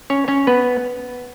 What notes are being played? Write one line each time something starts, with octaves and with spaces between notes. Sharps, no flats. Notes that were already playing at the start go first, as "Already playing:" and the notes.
C#4 C#5
C#4 C#5
B3 B4